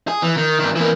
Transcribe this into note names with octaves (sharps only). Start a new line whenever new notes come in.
G#4
E3
D#3
G2 D#3
E3 A#3